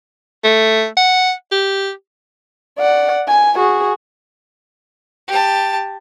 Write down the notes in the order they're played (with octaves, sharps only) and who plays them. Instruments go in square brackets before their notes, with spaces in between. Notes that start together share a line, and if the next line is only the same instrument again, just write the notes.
[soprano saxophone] A3
F#5
G4
[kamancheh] D5 F#5
G#5
F#4 G#4
[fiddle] G4 A5